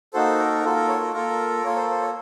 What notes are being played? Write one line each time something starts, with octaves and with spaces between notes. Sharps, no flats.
A#3 D#4 F#4 A4 C5
A#4
A#3 F4 A4
A#4
C#5
A#4
A#3 F4 A4 A#4
A#3 F4 A4 C#5
C5
C5
C#5